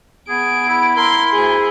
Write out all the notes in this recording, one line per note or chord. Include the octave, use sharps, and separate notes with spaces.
B3 G#4 D7
E4
A#4 C6
D2 G#4